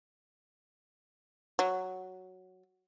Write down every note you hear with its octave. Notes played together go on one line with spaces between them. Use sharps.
F#3